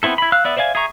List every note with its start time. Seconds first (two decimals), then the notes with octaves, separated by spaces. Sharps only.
0.03 B3 C4 E4 A4
0.18 E4 B5
0.32 F5 E6 F#6
0.45 B3 D5 E5
0.57 C5 D5 E5 F5 G#5
0.75 G#4 E5 A#5 C#6